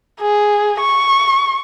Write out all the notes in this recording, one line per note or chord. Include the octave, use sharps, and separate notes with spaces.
G#4
C#6